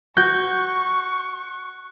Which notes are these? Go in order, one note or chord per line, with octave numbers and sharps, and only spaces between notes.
F#4 C#6 F#6 G6